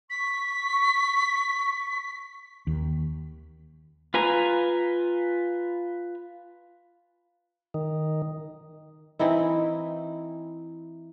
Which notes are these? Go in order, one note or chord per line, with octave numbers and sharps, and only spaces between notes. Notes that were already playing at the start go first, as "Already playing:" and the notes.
C#6 B6
D#2
F4 B4 G#5 A#5
D#3
E3 C4 D#4 E4